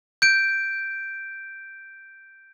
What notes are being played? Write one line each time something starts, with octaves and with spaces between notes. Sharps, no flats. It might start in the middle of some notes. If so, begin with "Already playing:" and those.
G6 D7